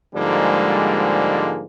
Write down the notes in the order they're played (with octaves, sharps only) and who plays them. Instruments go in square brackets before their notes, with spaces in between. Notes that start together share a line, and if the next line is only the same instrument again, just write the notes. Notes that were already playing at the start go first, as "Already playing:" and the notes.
[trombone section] G#2 D3 F3 G3 G#3 A#3